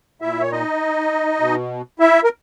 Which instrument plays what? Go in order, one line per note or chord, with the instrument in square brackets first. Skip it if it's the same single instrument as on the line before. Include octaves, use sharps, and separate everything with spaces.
[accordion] A#2 E4 E5
C#5
D#4 D#5
B2
E4 E5
A#4